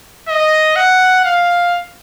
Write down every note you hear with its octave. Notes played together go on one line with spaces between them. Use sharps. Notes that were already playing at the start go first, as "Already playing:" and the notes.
D#5
F#5
F5